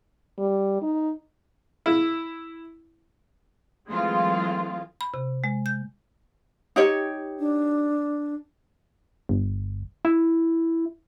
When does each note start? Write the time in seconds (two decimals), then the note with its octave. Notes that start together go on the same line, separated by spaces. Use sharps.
0.38 G3
0.82 D#4
1.86 E4
3.88 E3 F#3 G#3 A3 C4 F4
5.01 B5
5.14 C3
5.44 G#3
5.66 G6
6.76 D#4 G4 C#5
7.39 D4
9.29 G1
10.05 E4